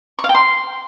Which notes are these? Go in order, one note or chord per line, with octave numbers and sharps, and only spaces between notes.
C#6
F5
G5
C6